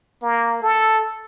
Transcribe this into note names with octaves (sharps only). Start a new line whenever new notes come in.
A#3
A4